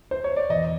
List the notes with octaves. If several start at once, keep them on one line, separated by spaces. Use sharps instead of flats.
C5
C#5
D5
E2 D#5